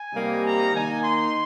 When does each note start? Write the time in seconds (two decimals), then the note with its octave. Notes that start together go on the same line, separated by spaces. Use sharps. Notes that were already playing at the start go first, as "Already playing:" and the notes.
Already playing: G#5
0.14 C3 G3 A#3 D#4
0.43 A#5
0.73 D#3 A#3 D#4 G#5
1.03 C6